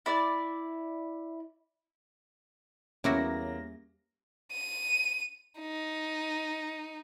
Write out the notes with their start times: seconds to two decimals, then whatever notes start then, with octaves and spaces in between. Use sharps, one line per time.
0.06 E4 D5
3.04 E2 G3 A#3 C#4 E4 F#4 A#6
4.52 D#7
5.59 D#4